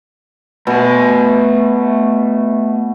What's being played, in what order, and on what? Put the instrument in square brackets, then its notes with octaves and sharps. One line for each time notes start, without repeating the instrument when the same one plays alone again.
[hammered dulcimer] B2 [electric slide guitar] A3 G#5